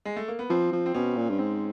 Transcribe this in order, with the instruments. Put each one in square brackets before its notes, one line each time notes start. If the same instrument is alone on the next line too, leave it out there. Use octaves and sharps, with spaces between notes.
[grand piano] G#3
A3
A#3
B3
[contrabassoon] F3 [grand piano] C4
[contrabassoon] F3
[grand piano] C4
[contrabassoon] B2 [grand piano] C#4
[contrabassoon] A#2
G2
[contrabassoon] G#2 [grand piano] C4